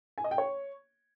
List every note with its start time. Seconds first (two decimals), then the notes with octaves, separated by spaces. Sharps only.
0.18 G#5
0.24 D#5
0.31 G5
0.38 C#5